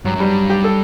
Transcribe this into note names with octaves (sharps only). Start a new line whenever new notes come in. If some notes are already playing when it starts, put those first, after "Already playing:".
G2 F#3
F#2 G3
G2
G4
A4